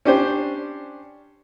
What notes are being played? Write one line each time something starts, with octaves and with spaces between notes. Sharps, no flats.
C#4 D4 G4 C5